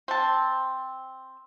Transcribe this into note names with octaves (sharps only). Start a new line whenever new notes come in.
C4 A5